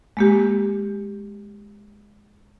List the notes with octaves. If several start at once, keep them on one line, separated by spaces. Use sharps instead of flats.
G#3 A#3 G4